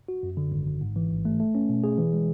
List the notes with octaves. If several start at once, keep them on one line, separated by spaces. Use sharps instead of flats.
F#4
F#2
D3
G#1
G#1
G#2
E3
A1
A3
A3
C#4
B2
G#4
E3
G#3